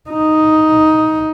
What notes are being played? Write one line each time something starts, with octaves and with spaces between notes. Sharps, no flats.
D#4